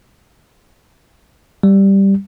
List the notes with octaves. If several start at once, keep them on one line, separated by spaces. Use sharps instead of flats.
G3